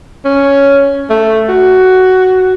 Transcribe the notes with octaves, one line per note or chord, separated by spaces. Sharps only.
C#4
A3
F#4